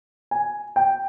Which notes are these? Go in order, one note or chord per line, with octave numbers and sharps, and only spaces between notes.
G#5
G5